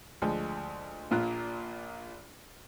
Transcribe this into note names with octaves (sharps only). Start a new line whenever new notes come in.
D2 F3 G#3
A#1 A#2 F4 A#4 F#6